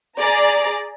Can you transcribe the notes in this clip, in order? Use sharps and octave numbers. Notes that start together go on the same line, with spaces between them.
G#4 D5 A#5